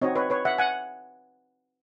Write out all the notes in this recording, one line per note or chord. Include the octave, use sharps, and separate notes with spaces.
C4 D#4 F#4 C#5 D#5
B4 C#5
B4 C#5
E5 F#5
F#5 G#5